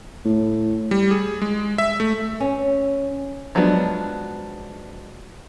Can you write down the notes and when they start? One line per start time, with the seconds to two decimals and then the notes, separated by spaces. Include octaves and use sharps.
0.25 A2
0.91 G3
1.11 G#4
1.42 G#3
1.78 E5
2.00 A3
2.40 C#4
3.55 F3 F#3 G#3 B3 D4